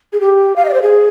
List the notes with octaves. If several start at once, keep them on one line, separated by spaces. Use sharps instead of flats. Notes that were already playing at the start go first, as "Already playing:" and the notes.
G#4
G4
F5
D#5
D5
C5
G#4